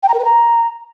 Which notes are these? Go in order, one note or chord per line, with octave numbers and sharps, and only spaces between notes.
G5
A#5
A#4
B4
A#5